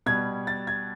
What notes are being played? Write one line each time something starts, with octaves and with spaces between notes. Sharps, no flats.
B2 G3 G#6
A6
G#6